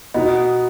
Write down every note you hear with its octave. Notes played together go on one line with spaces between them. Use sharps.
B2 B3 D#4